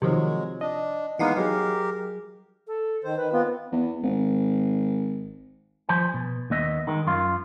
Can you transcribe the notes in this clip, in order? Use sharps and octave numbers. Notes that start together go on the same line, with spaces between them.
C3 D#3 F3 F#3 G#3
D4 D#5
E3 G#3 A#3 B3 D#4 F5 F#5
F#3 G4 G#4 A#4
A4
D#3 C5
D#3 B4
B3 C4 F4
E2
G#1
F3 C5 G#5
B2
D#2 B3 D#5 E5
D#3 G#3
F#2 F4